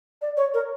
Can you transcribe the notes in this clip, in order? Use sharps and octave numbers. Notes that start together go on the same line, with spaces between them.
D5
C#5
A#4